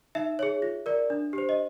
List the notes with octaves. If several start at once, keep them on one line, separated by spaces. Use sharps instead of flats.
D#4 E5
G#4 C#5
F4
A#4 D5
D4
G4 C5
D#5